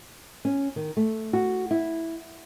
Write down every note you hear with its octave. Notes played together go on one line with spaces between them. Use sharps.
C#4
D#3
A3
F#4
E4